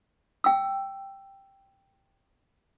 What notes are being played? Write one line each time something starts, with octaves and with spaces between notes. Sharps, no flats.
G5 E6